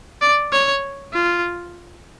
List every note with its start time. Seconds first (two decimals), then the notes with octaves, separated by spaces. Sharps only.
0.22 D5
0.52 C#5
1.13 F4